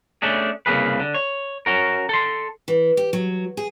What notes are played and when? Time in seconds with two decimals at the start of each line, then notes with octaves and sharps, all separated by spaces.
0.22 A3 C#4 D4 G#4
0.66 C2 C#3 A#3 G#4 B4
1.00 D3
1.14 C#5
1.66 C#4 F#4 A#4
2.09 A4 C6
2.68 E3
2.97 G4
3.13 F#3
3.57 G#4